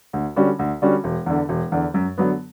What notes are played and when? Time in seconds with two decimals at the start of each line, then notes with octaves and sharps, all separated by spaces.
0.13 D2
0.36 D3 G3 C#4 F#4
0.59 D2
0.82 D3 G3 C#4 F#4
1.04 E1
1.26 E2 D3
1.49 E1
1.72 E2 D3
1.94 F#2
2.18 D3 F#3 B3